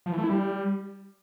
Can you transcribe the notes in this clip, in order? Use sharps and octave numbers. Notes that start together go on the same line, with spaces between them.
F3
E3
A3
E4
G3